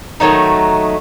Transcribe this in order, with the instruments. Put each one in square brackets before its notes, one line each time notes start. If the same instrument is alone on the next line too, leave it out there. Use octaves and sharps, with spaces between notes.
[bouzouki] D#3 F#3 A3 D#4